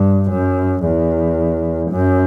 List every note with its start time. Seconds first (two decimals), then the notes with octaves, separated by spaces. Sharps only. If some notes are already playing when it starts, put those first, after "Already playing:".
Already playing: G2
0.30 F#2
0.85 E2
1.91 F#2